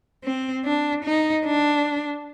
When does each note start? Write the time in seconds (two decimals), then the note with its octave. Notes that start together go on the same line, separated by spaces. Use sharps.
0.24 C4
0.65 D4
1.05 D#4
1.45 D4